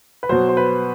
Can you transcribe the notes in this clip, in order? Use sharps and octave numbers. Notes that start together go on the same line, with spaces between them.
B4
B2 F#3 C5
C5
B4